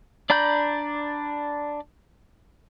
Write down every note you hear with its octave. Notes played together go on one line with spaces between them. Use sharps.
D4 D5 A#5 B5 G6